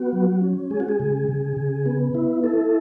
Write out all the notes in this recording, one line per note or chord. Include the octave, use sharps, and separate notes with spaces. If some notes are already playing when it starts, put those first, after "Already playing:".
Already playing: B3 F#4
F#3
C#4
G#3 G#4
F#4
G#4
C#3
C#3
C#3
B3
E4
E4 A4